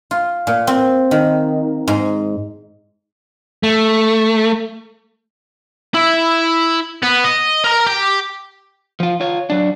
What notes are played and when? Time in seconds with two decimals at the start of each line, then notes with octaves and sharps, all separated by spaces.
0.11 F4
0.47 A#2
0.67 C4
1.11 D#3
1.88 G#2
3.63 A3
5.94 E4
7.03 B3
7.25 D#5
7.64 A#4 A#5
7.87 G4
9.00 F3 F4
9.21 F4 C#5
9.50 F#3 D4